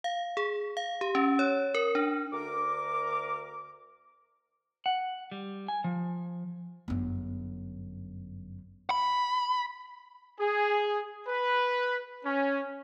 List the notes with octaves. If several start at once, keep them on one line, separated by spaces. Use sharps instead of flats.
F5
G#4
F5
G4
C#4
C#5
A#4
D4
D2 A#4 D6
F#5
G3
G#5
F3
G1 F#2
B5
G#4
B4
C#4